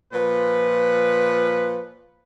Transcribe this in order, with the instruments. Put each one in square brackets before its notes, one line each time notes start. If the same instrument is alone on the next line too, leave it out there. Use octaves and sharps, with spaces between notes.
[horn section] A#2 F3 B4